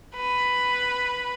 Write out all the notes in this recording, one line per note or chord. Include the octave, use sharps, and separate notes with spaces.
B4